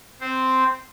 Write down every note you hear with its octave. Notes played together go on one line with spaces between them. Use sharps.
C4 C5